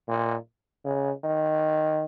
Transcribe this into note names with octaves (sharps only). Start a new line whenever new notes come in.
A#2
C#3
D#3